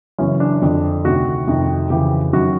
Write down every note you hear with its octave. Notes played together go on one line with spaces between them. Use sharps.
F#2 C#3 E3 C#4
D4
F2 D3
D2 C3 D#3 F#4
F2 C3 D#3
F2 C#3 E3 G4
F#2 D#3 F#4